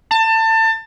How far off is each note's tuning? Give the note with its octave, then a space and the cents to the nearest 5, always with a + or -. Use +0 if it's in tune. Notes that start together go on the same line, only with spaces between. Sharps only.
A5 +25